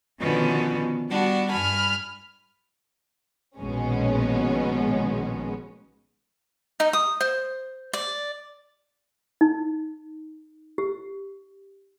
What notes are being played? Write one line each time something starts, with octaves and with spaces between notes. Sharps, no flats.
B2 D3 D#3 F3 B3 C#4
G3 B3 D4 F#4
G2 G#5 B5 F6
A#1 B2 D#3 G#3 B3 C#4
D#4
D#6
C5
D5
D#4
G4